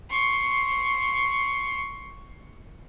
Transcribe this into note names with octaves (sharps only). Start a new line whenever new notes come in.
C6 C#6